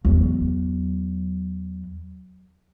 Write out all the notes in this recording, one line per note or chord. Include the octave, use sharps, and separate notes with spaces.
E2 F#3